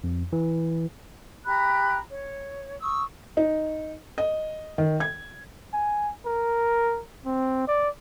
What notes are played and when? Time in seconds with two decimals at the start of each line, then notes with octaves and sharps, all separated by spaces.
0.04 F2
0.33 E3
1.45 G4 A#5 B5 F#6
2.09 C#5
2.81 C#6 D#6 E6
3.37 D#4
4.18 D#5
4.78 D#3
5.00 G#6
5.74 G#5
6.26 A#4
7.26 C4
7.68 D5